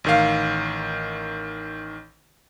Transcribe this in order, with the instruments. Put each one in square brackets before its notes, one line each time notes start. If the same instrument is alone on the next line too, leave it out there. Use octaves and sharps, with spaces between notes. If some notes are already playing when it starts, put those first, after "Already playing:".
[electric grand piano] A1 D#3 F5